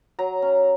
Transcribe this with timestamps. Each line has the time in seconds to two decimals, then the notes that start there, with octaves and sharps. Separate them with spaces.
0.19 F#3 A#5
0.42 C#4